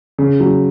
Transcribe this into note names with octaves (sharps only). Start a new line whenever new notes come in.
C#3
F#3